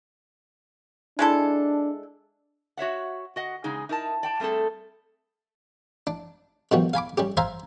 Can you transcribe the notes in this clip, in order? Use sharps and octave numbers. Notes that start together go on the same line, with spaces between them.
G#3 D4 E4 A4
F#4 C#5 E5 F#5
F#4 D#5 F#5
E2 C#3 G#3 D#4 G#4
D#4 E4 A#4 B4 A5
D5 G5 A5
G3 A3 C4 G#4 A4
D4
B2 D#3 F3 G3 F#4
F5 G#5 B5 D6
G3 C#4 G4
C5 E5 F5 G#5 A#5 C6